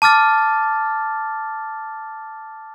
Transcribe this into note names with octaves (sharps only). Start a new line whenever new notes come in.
A5 D6 F6 A6